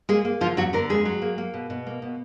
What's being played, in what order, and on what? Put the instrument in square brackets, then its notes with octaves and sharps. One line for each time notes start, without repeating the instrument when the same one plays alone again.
[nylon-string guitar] G#3 A#3 G#4
A#3
D3 F3 F4
F2 F#3 F#4
D3 A#3 A#4
F2 G#3 G#4
F#3
A#3
A#3
B2
B2
A#3
B2